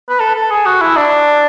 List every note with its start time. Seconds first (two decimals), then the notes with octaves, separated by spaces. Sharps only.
0.09 B4
0.20 A4
0.36 A4
0.50 G#4
0.66 F#4
0.81 E4
0.97 D4